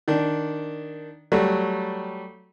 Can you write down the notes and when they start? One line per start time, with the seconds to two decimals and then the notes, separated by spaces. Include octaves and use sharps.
0.08 D#3 D4
1.32 F#3 G3 A3